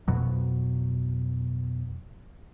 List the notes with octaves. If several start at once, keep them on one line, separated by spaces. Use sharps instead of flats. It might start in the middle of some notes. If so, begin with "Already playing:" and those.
F2 B2 F#3